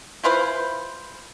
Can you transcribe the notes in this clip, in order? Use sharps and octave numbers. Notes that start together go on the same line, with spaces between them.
E4 F4 B4 C5